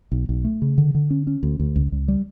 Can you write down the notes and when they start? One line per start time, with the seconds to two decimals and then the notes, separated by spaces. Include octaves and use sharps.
0.12 B1
0.29 B1
0.44 A3
0.62 C#3
0.78 D3
0.95 D3
1.10 C#4
1.27 C#4
1.43 D2
1.59 D2
1.76 C#2
1.92 C#2
2.08 G3